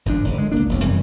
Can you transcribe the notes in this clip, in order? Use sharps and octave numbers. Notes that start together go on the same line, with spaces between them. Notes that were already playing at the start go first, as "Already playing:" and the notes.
G#1 G#2 F3 D4
F#1
D3 G#3
C#2 A#3 D4
E1 E2
F#2 C3 E3 G3